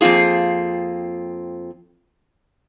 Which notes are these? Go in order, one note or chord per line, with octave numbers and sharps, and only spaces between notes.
F2 A#3 C4 F4 G#4